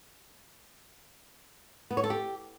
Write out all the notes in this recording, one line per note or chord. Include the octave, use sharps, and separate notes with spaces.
B3
C#5
A4
G4